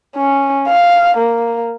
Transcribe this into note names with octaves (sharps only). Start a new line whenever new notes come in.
C#4
F5
A#3